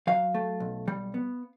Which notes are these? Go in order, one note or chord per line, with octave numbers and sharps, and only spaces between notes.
F#3 F5
A3
B1
G3
B3